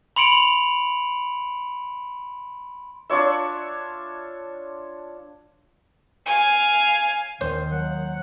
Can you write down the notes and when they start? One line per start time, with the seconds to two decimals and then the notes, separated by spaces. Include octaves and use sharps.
0.16 B5 C6 C#7 D7 F7 F#7
3.10 D4 F4 C#5 E5
6.26 F5 G#5
7.41 D#2 D#3 C5
7.72 F#3 F#5